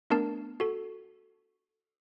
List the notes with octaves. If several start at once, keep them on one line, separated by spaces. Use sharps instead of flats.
A3 B3 D4 A#4 A5
F#4 A4